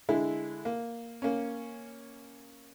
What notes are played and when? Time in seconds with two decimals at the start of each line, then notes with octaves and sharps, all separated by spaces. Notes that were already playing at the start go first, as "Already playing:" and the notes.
0.09 D3 G#3 E4
0.65 A#3
1.22 A#3 C#4